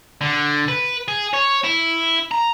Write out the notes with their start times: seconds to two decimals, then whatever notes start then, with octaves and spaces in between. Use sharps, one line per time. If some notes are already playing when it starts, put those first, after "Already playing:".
0.21 D3
0.68 B4
1.08 G#4
1.33 C#5
1.64 E4
2.31 A#5